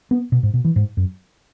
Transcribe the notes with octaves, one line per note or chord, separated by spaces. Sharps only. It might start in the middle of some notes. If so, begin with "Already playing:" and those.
B3
B2
G#2
B2
E3
G#2
F#2